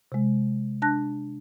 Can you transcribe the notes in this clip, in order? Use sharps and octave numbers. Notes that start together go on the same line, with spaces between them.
C3 G#3
D4 A5 F#6 A#6